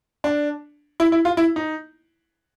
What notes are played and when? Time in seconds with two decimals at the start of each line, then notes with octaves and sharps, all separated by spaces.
0.24 D4
1.00 E4
1.12 E4
1.25 F4
1.37 E4
1.56 D#4